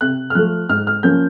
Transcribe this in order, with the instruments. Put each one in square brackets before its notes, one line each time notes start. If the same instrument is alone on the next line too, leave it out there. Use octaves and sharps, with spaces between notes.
[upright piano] C3 F#6
F6
F3 A3 F#6
G#2 F6
F6
F3 A#3 C#4 G6